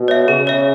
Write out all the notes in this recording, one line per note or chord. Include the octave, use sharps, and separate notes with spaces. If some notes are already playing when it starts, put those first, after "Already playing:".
Already playing: B2
C#5 E5
C#3 G#4
C#5 E5